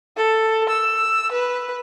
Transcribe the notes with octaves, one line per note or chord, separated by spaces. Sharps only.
A4
E6
B4